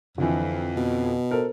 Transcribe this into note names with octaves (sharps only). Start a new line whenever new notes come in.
F2 D3 E3
B2
A4 A#4 C5